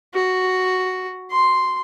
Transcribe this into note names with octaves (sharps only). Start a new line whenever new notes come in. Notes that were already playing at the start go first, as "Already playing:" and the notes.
F#4
C6